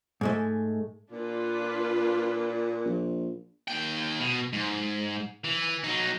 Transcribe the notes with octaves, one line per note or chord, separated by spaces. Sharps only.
G#2 G#3 A3
A#2 D4 F4 B4
A#1
D#2 G5
B2
G#2
E3
F#3 D#4